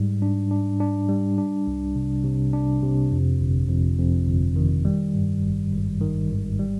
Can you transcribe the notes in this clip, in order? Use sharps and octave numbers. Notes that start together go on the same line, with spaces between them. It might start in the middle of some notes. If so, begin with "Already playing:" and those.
Already playing: G#2 G3
D4
D4
D4
G3
D4
C2
C3
C3
D4
C3
F2
G1
F2
F2
G1
D#3
G3
G2
G#1
G#1
D#3
G#1
G3